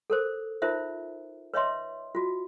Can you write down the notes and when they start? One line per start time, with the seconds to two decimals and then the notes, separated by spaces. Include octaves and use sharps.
0.10 A4 A#4 C5
0.62 D#4 F4 A#4 C5 E5
1.54 B4 C#5 D#5 E5 C6
2.15 F4 F#4